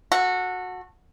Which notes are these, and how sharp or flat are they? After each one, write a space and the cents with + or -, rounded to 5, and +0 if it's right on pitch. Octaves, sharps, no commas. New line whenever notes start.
F#4 -15 A4 +20